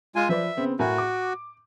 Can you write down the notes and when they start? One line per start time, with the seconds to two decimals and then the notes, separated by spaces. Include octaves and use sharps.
0.16 G#3 F4 G#5
0.29 F3 B4 D5 E5
0.57 C#3 B3 C4
0.79 A2 F#4 A#4 G#5
0.98 D6